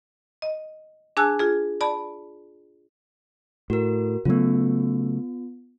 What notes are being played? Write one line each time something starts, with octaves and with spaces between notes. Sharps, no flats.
D#5
D4 G#4 G#5 A5 E6 F#6
F4 G#4
D5 A5 B5
A2 F#4 A#4
C#3 F#3 A3 B3 F4